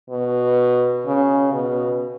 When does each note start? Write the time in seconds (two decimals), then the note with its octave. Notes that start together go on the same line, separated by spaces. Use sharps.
0.10 B2
1.06 C#3
1.53 B2